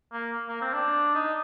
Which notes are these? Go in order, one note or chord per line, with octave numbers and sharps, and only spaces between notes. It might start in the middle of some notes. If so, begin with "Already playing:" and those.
A#3
A#3
C4
D4
D#4